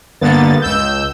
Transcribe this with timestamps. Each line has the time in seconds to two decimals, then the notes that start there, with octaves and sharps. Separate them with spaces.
0.21 G2 D3 A#3 B3 A6
0.62 C#2 E6 G6